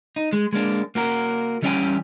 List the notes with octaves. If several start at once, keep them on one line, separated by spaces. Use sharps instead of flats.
D#4
G#3
G#3 A#3 D4
A#3 F#4 A#4
E3 G3 C#4 D5 G5 G#5